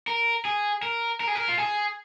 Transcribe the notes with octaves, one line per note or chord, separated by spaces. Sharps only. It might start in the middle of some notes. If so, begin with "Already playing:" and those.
A#4
G#4
A#4
A#4
G#4
A#4
F4
G#4